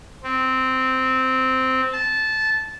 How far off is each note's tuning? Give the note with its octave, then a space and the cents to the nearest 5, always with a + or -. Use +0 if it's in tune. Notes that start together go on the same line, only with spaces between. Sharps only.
C4 -10
A5 -15